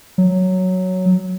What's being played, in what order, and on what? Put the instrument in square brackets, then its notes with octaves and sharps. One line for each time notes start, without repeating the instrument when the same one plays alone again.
[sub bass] F#3